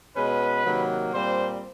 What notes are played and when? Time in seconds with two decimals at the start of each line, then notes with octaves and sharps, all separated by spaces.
0.16 B2 G#3 C#4 B4
0.65 C3 D#3 F#3 A#3
1.14 A#2 G3 C4 C5